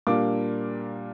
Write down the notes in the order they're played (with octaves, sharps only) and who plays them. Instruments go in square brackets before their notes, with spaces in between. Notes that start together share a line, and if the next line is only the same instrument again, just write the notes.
[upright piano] A#2 G3 A#3 D4 D6